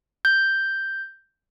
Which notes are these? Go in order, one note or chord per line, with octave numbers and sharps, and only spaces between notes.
G6